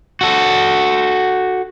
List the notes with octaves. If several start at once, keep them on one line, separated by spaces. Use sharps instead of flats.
F#4 A4